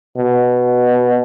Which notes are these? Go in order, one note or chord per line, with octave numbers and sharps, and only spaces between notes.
B2